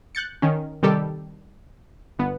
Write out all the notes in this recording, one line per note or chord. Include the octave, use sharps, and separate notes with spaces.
F#6 G6 A6 C#7
D#3 C#4
C3 D#3 G3 G4 A4
G1 B3